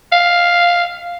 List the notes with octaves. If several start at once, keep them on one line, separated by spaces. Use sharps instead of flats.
F5